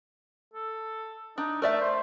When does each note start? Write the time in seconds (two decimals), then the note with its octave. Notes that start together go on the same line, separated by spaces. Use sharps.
0.54 A4
1.38 D4 D#4
1.62 A3 A#4 D5 E5
1.82 C5